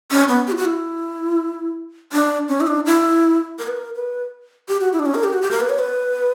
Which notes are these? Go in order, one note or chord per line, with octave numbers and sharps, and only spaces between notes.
C#4
B3
G4
E4
F#4
E4
D4
C#4
E4
D4
E4
A#4
B4
A#4
B4
G4
F#4
E4
D4
C#4
A#4
G4
F#4
G4
A#4
B4
C#5
B4